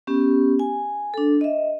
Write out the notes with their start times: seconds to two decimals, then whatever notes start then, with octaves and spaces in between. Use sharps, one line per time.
0.07 B3 C#4 G4
0.59 G#5
1.14 D4 A4
1.41 D#5 E5